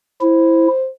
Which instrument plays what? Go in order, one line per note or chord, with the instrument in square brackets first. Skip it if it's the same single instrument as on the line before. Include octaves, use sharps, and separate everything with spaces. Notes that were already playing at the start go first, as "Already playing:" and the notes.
[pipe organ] E4 [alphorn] C5